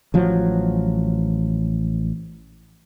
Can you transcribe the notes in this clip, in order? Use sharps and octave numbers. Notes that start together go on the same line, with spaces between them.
A1 F3 F#3